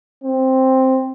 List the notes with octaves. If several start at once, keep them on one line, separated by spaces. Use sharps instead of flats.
C4